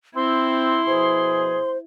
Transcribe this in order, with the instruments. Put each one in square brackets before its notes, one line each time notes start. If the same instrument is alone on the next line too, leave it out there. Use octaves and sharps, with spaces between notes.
[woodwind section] C4 [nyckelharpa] E4 [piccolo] C6
[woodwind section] B2 F3 G#4 [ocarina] C5